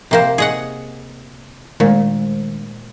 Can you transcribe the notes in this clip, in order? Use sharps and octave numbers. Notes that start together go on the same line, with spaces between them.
C3 A#3 C5
G#4 D#5 F#5
A#2 D#3 G#3